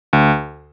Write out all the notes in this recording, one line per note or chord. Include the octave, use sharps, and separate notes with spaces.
D2